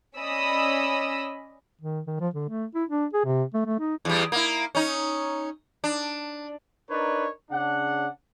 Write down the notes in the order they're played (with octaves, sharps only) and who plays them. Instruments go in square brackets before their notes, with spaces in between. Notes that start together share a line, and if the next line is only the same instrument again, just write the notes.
[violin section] C#4 D5 D#5 B5 D#6 E6
[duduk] D#3
D#3
F3
D3
A3
E4
D4
G#4
C3
A3
A3
D#4
[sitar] E2 G3
A#3 E4
C#4 D#4
D4
[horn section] D4 D#4 A#4 B4 C#5 D5
C#3 D4 F#5